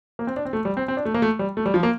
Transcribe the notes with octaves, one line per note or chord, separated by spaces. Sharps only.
A#3
C4
D4
C4
A3
G3
C4
C4
D4
A3
A#3
A3
G3
A3
G3
F3
A#3